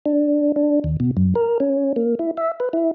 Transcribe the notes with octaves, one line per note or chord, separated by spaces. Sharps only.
D4
D4
D#2
B2
F#2
A#4
C#4
A#3
E4
E5
B4
E4